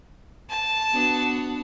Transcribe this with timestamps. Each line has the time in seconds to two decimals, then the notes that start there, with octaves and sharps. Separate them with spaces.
0.50 A5
0.93 B3 D4 F#4